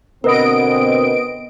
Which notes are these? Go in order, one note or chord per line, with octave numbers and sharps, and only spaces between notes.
B2 D3 B3 C4 A#4 D#5 D7